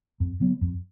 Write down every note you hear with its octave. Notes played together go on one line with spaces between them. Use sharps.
F2
C#3 F#3 B3
F2